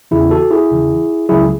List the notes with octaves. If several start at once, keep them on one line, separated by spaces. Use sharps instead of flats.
E2 C#3 E3 E4 G#4
F#4 A4
E4 G#4
E2 C#3 E3
C#2 C#3 F#3 E4 G#4